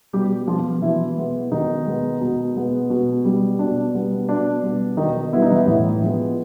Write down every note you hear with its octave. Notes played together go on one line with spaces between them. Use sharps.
B2 G3 G4
F3 G#3 B3 F4
B2 E3 E4
G#3 B3
B2 D#3 D#4
G#3 B3
B2
G#3 B3
B2
G3 B3
B2 D4
G3 B3
B2 D4
G3 B3
B2 D#3 D#4
G3 B3 E4
D#4
E3 E4
A2 E3 E4
F3 G#3 B3